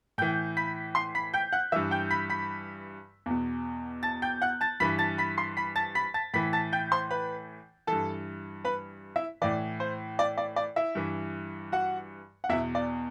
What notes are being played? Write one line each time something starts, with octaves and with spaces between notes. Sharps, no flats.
A2 E3 G5 G6
B5 B6
C6 C7
B5 B6
G5 G6
F#5 F#6
G2 E3 E5 E6
G5 G6
B5 B6
B5 B6
E2 B2
A5 A6
G5 G6
F#5 F#6
A5 A6
G2 E3 B5 B6
A5 A6
B5 B6
C6 C7
B5 B6
A5 A6
B5 B6
A5 A6
A2 E3 B5 B6
A5 A6
G5 G6
C5 C6
B4 B5
G2 E3 A4 A5
B4 B5
E4 E5
A2 E3 D5
C5
D5
D5
D5
E4 E5
G2 E3
F#4 F#5
F#5
E2 B2 E4 E5
D5